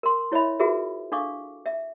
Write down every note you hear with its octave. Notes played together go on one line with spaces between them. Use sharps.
A#4 C6
E4 C#5 D#5 E5 B5
F4 F#4 G#4 A#4 B4 E5
D4 A4 F5 C#6 D6
E5